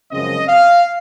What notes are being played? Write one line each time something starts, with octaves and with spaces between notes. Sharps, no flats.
F#2 C#3 F3 G#3 C4 D#5
F5